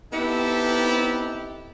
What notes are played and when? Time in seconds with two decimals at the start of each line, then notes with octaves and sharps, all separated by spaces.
0.13 B3 C4 D#4 E4 G4 A4